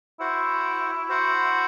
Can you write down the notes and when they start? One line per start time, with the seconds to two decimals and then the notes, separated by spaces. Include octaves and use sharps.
0.20 E4 F#4 C5 F#5
1.09 F#4 C5 F#5